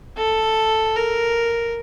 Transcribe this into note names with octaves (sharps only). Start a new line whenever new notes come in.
A4
A#4